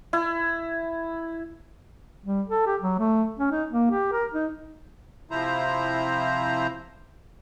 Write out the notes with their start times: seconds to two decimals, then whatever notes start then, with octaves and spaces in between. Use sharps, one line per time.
0.13 E4
2.25 G3
2.48 A4
2.67 G4
2.81 F#3
2.99 A3
3.39 C#4
3.51 D#4
3.71 A#3
3.91 G4
4.12 A#4
4.34 D#4
5.31 C3 F3 E4 C5 A#5